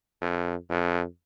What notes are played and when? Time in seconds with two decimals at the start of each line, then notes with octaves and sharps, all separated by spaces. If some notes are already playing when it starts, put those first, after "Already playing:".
0.22 F2
0.69 F2